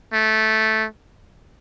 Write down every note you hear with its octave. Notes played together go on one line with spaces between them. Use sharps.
A3